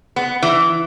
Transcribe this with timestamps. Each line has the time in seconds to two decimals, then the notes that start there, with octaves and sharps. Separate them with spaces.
0.16 B3
0.42 E3